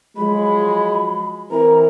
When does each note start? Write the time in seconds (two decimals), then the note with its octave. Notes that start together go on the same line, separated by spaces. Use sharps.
0.17 F3 F#3 G#3 B5
1.51 E3 C4 A#4 A#5